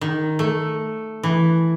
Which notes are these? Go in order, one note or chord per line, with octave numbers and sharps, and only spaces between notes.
D#3
A3
E3